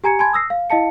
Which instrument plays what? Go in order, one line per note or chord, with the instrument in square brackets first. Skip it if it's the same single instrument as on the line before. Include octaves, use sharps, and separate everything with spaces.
[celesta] G4 G#5 A#5 G#6 C#7
G#5 A5 B5 C6 G#6
D#6 E6 A#6 C7
F5
E4 D#5 F5 A5 C#7